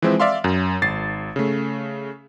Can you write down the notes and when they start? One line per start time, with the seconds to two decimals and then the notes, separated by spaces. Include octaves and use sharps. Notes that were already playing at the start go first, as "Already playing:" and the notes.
0.02 E3 F3 G#3 C4 C5 E5
0.20 D5 E5 F5 C6
0.44 F#2
0.82 G#1 A6 C7
1.36 C#3 A3